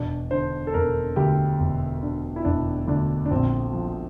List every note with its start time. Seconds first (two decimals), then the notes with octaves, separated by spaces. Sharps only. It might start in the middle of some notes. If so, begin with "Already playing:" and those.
Already playing: E1 D4
0.31 D3 C5
0.67 A4
0.74 E1 A#4
1.16 D2 G4
1.60 E1
2.03 D3
2.36 E4
2.45 E1 D4
2.88 D2 D4
3.25 D4
3.31 A#1 C4
3.73 F3